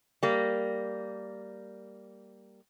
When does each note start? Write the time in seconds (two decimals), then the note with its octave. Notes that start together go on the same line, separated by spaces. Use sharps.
0.23 G3 A#3